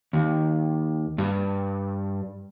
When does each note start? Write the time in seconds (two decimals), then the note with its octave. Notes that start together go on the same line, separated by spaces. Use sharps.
0.13 D#2
1.18 G2